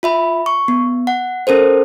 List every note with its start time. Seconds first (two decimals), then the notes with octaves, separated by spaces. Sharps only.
0.03 F4 E5 B5
0.46 C#6
0.68 B3
1.07 F#5
1.47 C#4 A4 A#4 C5